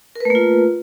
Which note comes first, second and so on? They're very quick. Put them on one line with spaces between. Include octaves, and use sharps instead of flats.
A#4 B4 A3 A#3 F4